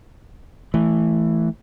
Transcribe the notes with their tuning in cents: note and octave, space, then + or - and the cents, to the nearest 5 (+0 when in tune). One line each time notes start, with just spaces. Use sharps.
E3 +0 A3 +0